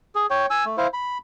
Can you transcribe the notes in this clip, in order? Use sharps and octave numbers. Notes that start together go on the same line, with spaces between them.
G#4
C#5 G5
G#5 E6
A3
E4 C5 F5
B5